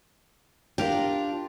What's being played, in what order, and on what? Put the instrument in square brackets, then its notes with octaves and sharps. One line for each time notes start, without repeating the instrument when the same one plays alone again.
[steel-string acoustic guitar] D4 F4 [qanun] G4 A#4